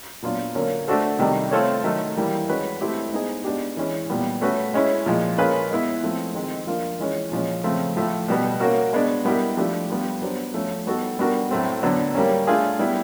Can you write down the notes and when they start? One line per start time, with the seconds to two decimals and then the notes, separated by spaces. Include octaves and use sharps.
0.22 A#2 F#3 B3 D4 F4
0.55 D3 F#3 A#3 C#4
0.88 A3 D4 F#4 A4 C5
1.19 C3 D#3 G3
1.51 A3 C4 F4 A4 C#5
1.84 D#3 F#3 A3
2.16 E3 G3 A#3
2.48 G#3 C#4 F#4 B4
2.81 A3 C4 E4 G4
3.12 G#3 B3 D#4 G#4 C5
3.45 G#3 B3 D4 G4
3.77 E3 G#3 C#4
4.10 A#2 G3 B3
4.41 A3 C#4 F#4 B4
4.74 G#3 C#4 E4
5.06 A#2 F3 G#3
5.38 A#3 C#4 F4 G#4 B4
5.71 G#3 B3 E4
6.03 F3 A3 C4
6.35 D#3 G#3 C4
6.67 F3 A#3 D4 F4
6.99 E3 G#3 C#4
7.32 A#2 F3 G#3 C#4
7.64 C#3 F3 A3 C4
7.96 A2 F3 A3
8.28 B2 G3 B3
8.60 A#3 C#4 F#4 A#4
8.93 G#3 B3 D4
9.25 G3 B3 E4 G4 A#4
9.57 F3 A3 D4 G4
9.90 G3 B3 D4 F4
10.22 F#3 B3 D4 G4 C5
10.54 F3 A3 C#4
10.86 G3 B3 D#4 F#4 A4
11.18 G3 B3 D4 F#4 A#4
11.51 A2 F#3 A3 C4
11.83 D3 F#3 B3 D4
12.15 G3 A#3 C#4
12.47 A3 D4 F4 G#4
12.79 G3 B3 E4